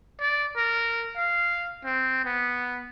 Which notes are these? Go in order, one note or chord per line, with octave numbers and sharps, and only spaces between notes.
D5
A#4
F5
C4
B3